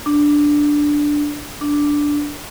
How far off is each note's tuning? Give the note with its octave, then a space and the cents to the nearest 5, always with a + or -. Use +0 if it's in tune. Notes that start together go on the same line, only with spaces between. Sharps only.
D4 +0
D4 -5